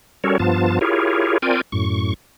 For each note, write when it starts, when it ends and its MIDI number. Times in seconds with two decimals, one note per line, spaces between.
0.24 0.38 55
0.24 0.38 61
0.24 0.38 66
0.24 0.38 69
0.24 0.38 70
0.24 0.38 73
0.39 0.79 43
0.39 0.79 53
0.39 0.79 59
0.39 0.79 65
0.39 0.79 81
0.81 1.38 64
0.81 1.38 65
0.81 1.38 67
0.81 1.38 68
0.81 1.38 70
0.81 1.38 73
1.42 1.61 60
1.42 1.61 65
1.42 1.61 70
1.42 1.61 74
1.42 1.61 79
1.42 1.61 80
1.72 2.14 42
1.72 2.14 45
1.72 2.14 85